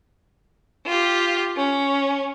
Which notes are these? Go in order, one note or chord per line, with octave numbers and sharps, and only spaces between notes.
F4 G4
C#4